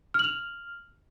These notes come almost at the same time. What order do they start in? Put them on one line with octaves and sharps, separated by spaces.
F6 F#7 F7